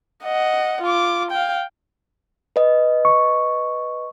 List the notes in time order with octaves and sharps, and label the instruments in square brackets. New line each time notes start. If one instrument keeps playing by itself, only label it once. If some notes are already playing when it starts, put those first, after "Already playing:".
[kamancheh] D#5 F#5
F4 D6
F5 G5
[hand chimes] B4 D#5
[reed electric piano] C#6